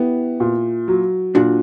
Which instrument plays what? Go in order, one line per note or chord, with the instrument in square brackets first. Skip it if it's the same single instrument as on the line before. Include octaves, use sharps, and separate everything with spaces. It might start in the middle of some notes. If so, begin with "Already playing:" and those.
Already playing: [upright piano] B3 [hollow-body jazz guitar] E4 G4
[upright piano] A#2
F#3
[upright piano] A#2 [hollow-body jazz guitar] D4 F#4